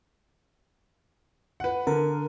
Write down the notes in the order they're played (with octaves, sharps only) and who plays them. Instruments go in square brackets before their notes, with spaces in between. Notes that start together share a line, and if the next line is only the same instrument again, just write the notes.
[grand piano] B4 F#5
[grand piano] D3 [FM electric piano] A#4